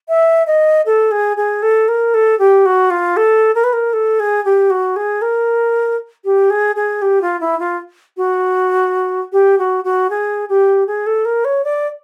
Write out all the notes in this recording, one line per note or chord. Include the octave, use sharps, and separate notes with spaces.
E5
D#5
A4
G#4
G#4
A4
A#4
A4
G4
F#4
F4
A4
A#4
B4
A#4
A4
G#4
G4
F#4
G#4
A#4
G4
G#4
G#4
G4
F4
E4
F4
F#4
G4
F#4
F#4
G#4
G4
G#4
A4
A#4
C#5
D5